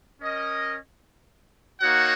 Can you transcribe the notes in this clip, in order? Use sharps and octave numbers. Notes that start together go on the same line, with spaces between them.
C#4 A#4 D#5
A#3 D#4 F#4 C#5 F#5